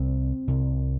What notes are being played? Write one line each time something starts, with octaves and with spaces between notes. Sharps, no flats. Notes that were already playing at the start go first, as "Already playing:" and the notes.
Already playing: C2 C3 C4
C2 C3